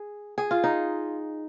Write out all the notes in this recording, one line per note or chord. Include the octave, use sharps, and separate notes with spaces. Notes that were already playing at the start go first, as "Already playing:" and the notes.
Already playing: G#4
G#4
F4
D#4